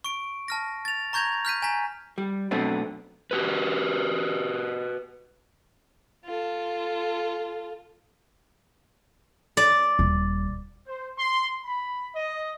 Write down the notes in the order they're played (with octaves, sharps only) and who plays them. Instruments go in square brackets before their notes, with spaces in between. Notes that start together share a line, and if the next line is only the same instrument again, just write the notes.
[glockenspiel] C#6 D7
A5 F6 A#6
A6 F7
A#5 C#6 G6 G#6 A#6 F7
F6 G6 B6 D#7
G#5 A#5 B6
[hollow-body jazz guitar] G3
F#2 B2 A3 B3 C4 D4
[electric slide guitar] F#4 G4 B4
[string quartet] F4 A4
[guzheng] D5
[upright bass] D#1
[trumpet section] C5
C6
B5
D#5